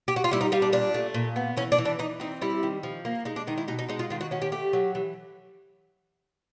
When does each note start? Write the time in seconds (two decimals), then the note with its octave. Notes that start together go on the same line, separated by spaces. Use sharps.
0.08 G4
0.16 F#4
0.24 F4
0.31 G3 E4
0.41 D#4
0.52 G3 F4
0.62 D4
0.73 A#2 D4
0.94 A3
1.14 A#2
1.36 B3
1.57 E3 C#4
1.72 D4
1.78 E3
1.85 D4
1.99 E3 D#4
2.20 C4 D#4
2.42 G3 E4
2.63 D#3
2.83 F3
3.05 A#3
3.25 G#3 D#4
3.36 D4
3.47 D#3 D#4
3.58 E4
3.68 B2 D#4
3.79 D#4
3.89 G#3 D#4
3.99 F4
4.10 D#3 F4
4.21 F#4
4.31 C#4 F#4
4.42 G4
4.52 A3 G4
4.73 F#3
4.95 E3